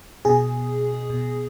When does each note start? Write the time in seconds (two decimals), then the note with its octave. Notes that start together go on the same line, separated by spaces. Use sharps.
0.25 B2 G#4
1.10 B2